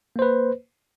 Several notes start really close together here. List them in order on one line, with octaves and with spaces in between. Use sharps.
A#3 C5 B4